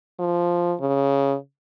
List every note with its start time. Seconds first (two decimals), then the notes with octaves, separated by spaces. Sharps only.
0.19 F3
0.81 C#3